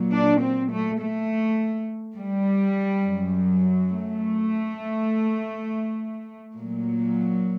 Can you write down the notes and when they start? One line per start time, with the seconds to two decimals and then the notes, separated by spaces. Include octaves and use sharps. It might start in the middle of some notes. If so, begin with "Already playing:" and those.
Already playing: A#2 F#3
0.12 D4
0.41 C4
0.71 A3
0.99 A3
2.16 G3
3.04 F#2 F#3
3.91 A3
6.55 A#2 F#3